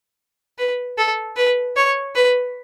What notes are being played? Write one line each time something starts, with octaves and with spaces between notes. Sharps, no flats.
B4
A4
B4
C#5
B4